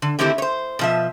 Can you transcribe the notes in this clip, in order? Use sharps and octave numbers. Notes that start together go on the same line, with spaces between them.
D3
D3 D#3 A3 C4 E4 G4
C5 C#5
B2 F3 E5